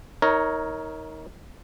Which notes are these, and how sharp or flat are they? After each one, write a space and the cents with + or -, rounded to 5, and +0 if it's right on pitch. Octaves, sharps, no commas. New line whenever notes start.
D#4 +30 A#4 +0 C#5 +0